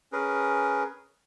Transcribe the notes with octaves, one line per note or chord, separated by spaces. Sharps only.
C#4 G#4 A#4 B4